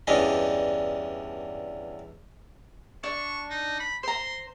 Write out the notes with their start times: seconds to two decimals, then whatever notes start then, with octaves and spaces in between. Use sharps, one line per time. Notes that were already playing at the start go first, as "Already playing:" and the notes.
0.07 E2 G2 E3 C#4 D4 D#5
3.04 D4 C#6
3.50 D#4
3.80 B5
4.03 C5 A#5 C6